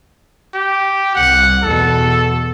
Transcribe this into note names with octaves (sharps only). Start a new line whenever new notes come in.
G4
C2 F#5
E2 B2 A4